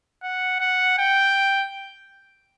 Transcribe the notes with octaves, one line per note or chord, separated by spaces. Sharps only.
F#5
F#5
G5